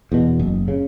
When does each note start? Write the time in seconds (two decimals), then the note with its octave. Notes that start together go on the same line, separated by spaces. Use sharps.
0.12 E2 B2
0.39 F#1
0.68 C#3